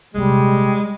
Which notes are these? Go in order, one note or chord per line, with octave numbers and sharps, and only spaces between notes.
D#1 C3 G3 G#3